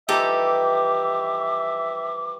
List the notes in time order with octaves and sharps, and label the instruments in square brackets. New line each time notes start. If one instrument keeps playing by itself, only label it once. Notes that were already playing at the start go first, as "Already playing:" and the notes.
[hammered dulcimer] E3 F3 G3 [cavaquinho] D#4 G4 A4 [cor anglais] E5 [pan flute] D6